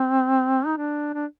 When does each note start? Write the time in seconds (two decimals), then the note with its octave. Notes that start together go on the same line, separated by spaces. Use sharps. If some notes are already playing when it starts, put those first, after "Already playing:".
Already playing: C4
0.66 D#4
0.77 D4
1.14 D4